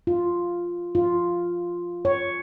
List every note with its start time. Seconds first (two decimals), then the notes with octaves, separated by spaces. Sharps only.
0.07 F4
0.95 F4
2.05 C#5